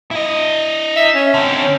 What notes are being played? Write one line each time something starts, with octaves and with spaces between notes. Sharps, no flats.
E4 D#5
E5
C#4
D3 C4
C#4